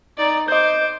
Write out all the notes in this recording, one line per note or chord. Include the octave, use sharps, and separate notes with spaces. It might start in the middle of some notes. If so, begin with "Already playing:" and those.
D#4 D5
C5 D#5 D6 G6